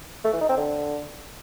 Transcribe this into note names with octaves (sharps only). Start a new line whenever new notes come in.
A3
E3
D#4
C4
D3